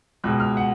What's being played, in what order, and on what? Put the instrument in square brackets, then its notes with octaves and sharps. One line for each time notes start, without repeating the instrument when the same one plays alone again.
[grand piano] C#2 B2 G#3 F#6
F6
F#5